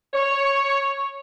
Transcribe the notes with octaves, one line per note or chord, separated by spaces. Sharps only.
C#5